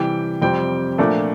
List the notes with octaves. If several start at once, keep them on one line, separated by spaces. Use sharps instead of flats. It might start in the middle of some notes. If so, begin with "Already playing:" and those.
Already playing: C3 E3 G3 G5
F2 C3 G3 C4 G5
A#2 F3 A3 D4